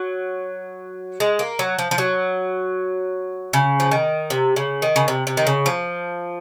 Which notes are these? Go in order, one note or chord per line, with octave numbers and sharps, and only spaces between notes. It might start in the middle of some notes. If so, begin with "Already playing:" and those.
Already playing: F#3
G#3
A#3
F#3
F3
F3
F#3
C#3
F3
D#3
C3
C#3
D#3
C#3
C3
C3
D#3
C#3
F3